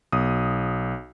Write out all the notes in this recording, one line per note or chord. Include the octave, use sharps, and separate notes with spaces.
B1 D#6